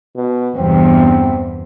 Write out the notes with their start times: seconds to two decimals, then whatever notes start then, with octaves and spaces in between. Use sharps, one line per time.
0.16 B2
0.56 E2 G2 C3 C4